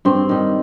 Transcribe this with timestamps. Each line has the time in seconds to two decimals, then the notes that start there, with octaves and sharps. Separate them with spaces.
0.05 G2 C4
0.29 D#3 G3